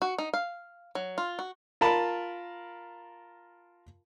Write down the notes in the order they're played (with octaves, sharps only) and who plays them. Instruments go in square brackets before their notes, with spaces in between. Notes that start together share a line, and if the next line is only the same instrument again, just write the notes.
[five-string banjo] F#4
D#4
F5
F#3
F4
F#4
[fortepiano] F4 A#4 A5 B5